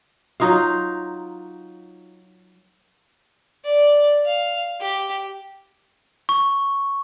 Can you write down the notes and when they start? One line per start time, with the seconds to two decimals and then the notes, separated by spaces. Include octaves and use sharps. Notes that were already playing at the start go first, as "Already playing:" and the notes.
0.40 F#3 D#4 F4 F5
3.64 D5
4.26 F5
4.81 G4
6.29 C#6